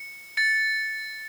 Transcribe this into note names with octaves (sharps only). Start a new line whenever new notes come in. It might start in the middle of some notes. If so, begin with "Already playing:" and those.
Already playing: C#7
A6 C#7